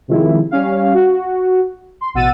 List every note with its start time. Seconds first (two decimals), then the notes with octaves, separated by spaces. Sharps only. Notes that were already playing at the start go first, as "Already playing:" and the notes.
0.08 C3 D#3 F3 G#3 E4
0.51 G3 C#4 F5
0.94 F#4
2.01 C6
2.14 A1 B2 F#5 E6 A6 D#7